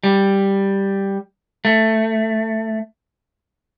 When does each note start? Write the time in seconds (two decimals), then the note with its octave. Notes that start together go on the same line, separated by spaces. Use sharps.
0.04 G3
1.65 A3